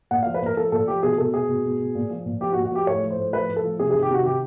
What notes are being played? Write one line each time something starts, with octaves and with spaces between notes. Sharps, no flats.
A#2 F#5
F5
F3
B4
A#2 A#4
F3 A4
A#2 A4
F3 G4
B2 G#4
B2 A4
B2 G#4
B2
B2
B2
A#2
F3
A#2
F3 G4
F#4
A#2
F#4
F3 G4
A2 C#5
F3
C5
A2
F3 B4
A2
A4
F3
C3 G#4
G#4
D#3
G4
C3 F#4
D#3 G4